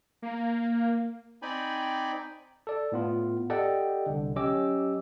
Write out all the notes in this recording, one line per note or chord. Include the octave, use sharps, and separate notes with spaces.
A#3
C4 D#4 D5 G5 G#5 B5
A4 D5
A2 B3 F4
G4 A4 D5 D#5 F#5 G5
C2 D3
F#3 C#4 G4 D#5 D6 E6